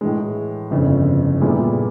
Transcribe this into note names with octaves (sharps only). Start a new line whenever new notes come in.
A2 E3 G#3
G1 F2 C#3 E3
A#2 G3 B3 E4 G#4